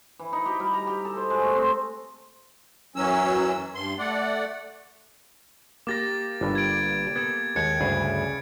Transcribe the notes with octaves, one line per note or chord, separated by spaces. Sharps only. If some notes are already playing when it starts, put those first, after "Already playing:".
E3
D#4
G4
G3
A#5
G4
A4
C5
G#3
A3
C4
F#2 E3 F#3 C#4 E6
G2 C6
A3 D5 F#5
A#3 G4 D6 A6 A#6
G1 G2
G#6 D7
B3 A4 G#6
D#2 G#3 F#6 G#6 C#7
D2 G2 C#3 G#4